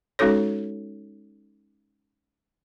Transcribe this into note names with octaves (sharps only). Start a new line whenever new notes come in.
G#3 C#4 D#4 F#4 A4 C#5